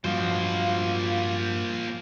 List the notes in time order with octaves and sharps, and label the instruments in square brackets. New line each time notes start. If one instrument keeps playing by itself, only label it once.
[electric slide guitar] G2 F#3 [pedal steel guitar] F3 F4 D#5 [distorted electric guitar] A#3 C5 [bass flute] F5